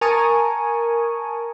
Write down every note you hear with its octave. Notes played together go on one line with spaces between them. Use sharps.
A#4 G#5 A5 C#6 D#6